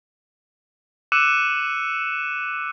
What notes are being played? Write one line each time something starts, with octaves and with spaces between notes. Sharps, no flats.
D6 E6 F#6 C#7 D#7 E7